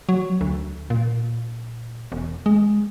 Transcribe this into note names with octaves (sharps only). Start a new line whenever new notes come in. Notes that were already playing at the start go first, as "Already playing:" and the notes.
F#3
D2
A#2
E1
G#3